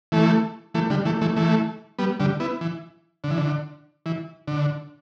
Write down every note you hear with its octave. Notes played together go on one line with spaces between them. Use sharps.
E3 A3
E3 A3
D3 G3
E3 A3
E3 A3
E3 A3
G3 B3
D3 G3
B3 E4
E3
D3
E3
D3
E3
D3